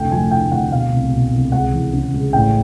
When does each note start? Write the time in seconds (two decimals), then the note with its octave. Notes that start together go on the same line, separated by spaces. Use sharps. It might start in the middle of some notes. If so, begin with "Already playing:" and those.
Already playing: F1 D2 G5
0.11 F3 G#5
0.31 D3 G5
0.52 D2 F#5
0.72 B2 F5
0.93 C2
1.12 B2
1.33 C2
1.52 C#2 F#5
1.73 E3
1.93 C#3
2.14 C#2
2.33 A1 G5